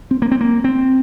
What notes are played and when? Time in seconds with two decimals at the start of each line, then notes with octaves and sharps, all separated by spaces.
0.11 C4
0.22 A#3
0.31 C4
0.41 A#3
0.64 C4